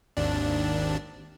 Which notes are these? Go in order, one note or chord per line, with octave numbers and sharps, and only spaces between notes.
G#1 D#2 D4